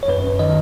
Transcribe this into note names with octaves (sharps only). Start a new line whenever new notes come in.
C#5
F#2 B4
F#2
D#3 D#5